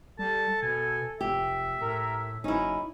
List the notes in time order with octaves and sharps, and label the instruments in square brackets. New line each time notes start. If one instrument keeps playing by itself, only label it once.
[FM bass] G3 [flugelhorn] A4 [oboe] A5
[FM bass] B2 [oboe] G#5
[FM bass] F1 [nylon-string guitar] G4 [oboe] E5
[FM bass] A2 [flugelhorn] A#4
[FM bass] F#1 [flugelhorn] C#4 [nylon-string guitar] D#4 E4